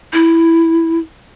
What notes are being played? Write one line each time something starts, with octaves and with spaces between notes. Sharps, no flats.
E4